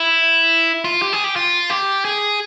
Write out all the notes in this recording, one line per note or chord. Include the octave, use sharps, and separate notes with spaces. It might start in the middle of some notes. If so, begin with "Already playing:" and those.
Already playing: E4
F4
G4
G#4
G4
F4
G4
G#4